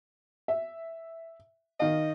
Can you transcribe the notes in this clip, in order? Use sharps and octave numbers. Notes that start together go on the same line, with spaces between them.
E5
D#3 D#5 F5